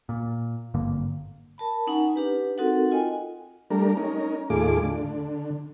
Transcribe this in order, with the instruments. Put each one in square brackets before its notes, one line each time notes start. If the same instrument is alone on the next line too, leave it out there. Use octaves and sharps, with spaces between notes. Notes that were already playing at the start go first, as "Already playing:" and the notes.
[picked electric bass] A#2
G#1 G2 D3 A#3
[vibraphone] A#4 A5 B5
C#4 D#4 F#5 G#5 A#5
D4 G4 B4
C4 D#4 F#4 A4 A#4 F#5
F4 D#5 G5 G#5
[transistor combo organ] G3 A3 D4 A#4
C#4 D#4 A#4
D#2 A2 A3 F4 G#4 D6
D3